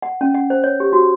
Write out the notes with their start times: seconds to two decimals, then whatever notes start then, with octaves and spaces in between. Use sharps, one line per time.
0.02 F#5
0.21 C#4
0.34 F#5
0.50 C5
0.64 C#5
0.80 G4
0.93 F#4